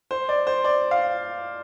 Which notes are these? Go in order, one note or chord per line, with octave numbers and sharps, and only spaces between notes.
C5
D5
C5
D5
F5